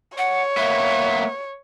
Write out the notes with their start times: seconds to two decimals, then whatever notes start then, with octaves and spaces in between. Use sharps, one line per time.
0.18 C#5 F#5
0.57 A#3 B3 E5